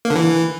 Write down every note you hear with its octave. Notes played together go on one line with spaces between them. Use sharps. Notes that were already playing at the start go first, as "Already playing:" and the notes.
A#3
D3
E3